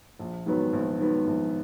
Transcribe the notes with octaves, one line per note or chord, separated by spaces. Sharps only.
A#1
G#2 D#3 F#3 B3
A#1
G#2 D#3 F#3 B3
A#1